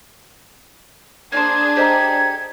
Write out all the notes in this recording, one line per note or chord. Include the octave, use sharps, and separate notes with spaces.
A#3 D4 G#4 C5 G#6
G4 A4 C5 D#5 A#5